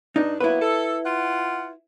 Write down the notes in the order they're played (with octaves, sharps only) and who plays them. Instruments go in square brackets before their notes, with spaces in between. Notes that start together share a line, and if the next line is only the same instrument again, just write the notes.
[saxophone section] G2 D4 [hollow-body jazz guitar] D#4
[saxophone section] F#3 A#3 B3 [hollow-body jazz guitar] E4 B4
[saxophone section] A4
F4 F#5